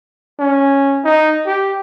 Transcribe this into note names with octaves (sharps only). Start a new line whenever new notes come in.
C#4
D#4
G4